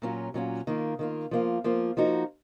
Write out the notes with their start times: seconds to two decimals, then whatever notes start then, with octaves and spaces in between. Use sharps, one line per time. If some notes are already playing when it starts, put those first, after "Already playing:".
0.02 A#2 F#3 C#4 F4
0.34 A#2 F#3 C#4 F4
0.67 D#3 A#3 F4
0.99 D#3 A#3 F4
1.31 F3 A#3 F4
1.64 F3 A#3 F4
1.97 F3 A#3 D#4 F#4